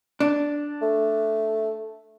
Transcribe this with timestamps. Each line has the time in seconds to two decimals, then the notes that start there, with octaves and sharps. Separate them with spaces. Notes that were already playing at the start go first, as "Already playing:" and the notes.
0.20 D4
0.82 A3